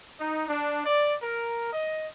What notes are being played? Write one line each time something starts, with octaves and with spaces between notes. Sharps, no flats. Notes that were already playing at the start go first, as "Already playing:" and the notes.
D#4
D4
D5
A#4
D#5